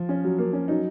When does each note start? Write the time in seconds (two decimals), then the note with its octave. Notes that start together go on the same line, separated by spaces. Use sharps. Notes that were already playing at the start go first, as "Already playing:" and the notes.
Already playing: F3
0.09 C#4
0.24 F#3
0.39 A#3
0.53 C#4
0.68 F#3 D#4